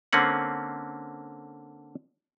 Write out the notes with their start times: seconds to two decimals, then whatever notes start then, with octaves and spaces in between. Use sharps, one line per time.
0.13 D3 A#3 C4 C#4 F#5